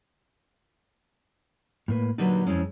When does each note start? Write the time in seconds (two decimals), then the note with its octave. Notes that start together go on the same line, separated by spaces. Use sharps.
1.88 A2 A#3 B4
2.18 A#2 D3 F#3 D#4 G4 B4
2.47 F2 G#3 C#4 E4 C#5